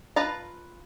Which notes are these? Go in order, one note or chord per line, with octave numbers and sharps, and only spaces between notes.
F4 B4 A5 A#5